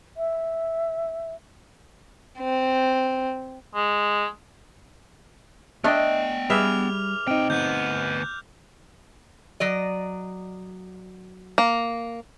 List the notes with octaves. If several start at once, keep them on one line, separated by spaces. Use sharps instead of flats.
E5
C4
G#3
A3 B3 D4 D#5 G5
G3 G#4 B4 E5 D6 F6 F7
A#2 C4 D#4 G5
D2 B3 F#6 G6
F#3 D5 D#5
A#3